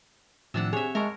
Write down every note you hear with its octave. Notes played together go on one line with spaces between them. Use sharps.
A2 C3 D#3 F3 D4 F#5 E6
C4 G4 G#4 C#5 E5
G#3 A#4 E5 A5 C#6